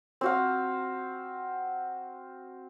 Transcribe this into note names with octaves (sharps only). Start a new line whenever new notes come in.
C4 F#4 F5